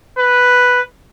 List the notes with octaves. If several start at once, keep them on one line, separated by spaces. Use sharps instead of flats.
B4